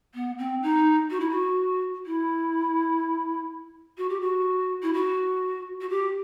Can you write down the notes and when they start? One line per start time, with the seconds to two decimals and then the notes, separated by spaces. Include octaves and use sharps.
0.15 B3
0.38 C4
0.63 D#4
1.10 F#4
1.20 E4
1.30 F#4
2.06 E4
3.98 F#4
4.09 G4
4.21 F#4
4.83 E4
4.93 F#4
5.81 F#4
5.90 G4